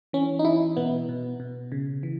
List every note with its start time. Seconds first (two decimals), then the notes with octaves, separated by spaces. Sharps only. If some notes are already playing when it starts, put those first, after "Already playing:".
0.13 E3 C#4
0.39 D#4
0.45 E3 E4
0.77 B2 B3
1.09 B2
1.40 B2
1.72 C#3
2.03 E3